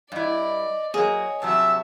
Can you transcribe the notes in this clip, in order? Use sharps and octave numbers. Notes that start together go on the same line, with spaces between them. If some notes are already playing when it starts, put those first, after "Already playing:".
G2 E4 D5 D#5
F#3 A#3 G#4 C#5 D#5
G2 C3 F#3 E5 A5 E6